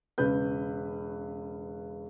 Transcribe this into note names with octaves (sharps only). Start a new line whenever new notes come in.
E1 C#3 B4 G6